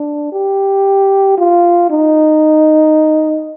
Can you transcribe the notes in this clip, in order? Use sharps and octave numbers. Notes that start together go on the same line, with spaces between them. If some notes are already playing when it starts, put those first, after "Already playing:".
Already playing: D4
G4
F4
D#4